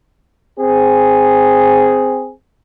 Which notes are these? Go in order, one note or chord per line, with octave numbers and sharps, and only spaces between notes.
C4 G#4